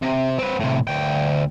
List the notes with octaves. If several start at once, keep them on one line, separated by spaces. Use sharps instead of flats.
C3
C4 B4
A2 C3
D2 G5